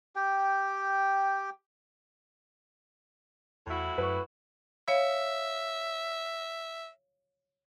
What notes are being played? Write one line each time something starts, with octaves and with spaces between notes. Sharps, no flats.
G4 G5
E2 A2 E4 F#4
F#2 B4 C#6
C#5 E5 F5